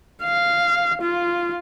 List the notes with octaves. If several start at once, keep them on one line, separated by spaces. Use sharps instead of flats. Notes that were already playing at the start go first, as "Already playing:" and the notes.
F5
F4